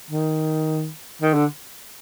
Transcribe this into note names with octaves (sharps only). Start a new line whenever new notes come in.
D#3
D#3
D3